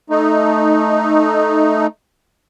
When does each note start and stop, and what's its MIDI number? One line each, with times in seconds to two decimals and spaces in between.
0.10 1.87 57
0.10 1.87 63